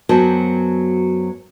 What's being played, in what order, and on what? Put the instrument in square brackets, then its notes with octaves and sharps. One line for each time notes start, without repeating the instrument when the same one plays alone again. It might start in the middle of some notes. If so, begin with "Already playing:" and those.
[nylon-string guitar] F#2 F#3 B3 C5 G5 A5